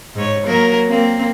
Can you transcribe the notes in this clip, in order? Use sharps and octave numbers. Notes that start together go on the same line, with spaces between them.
G#2 C#5
F#3 A#3 A#4
A#3 C4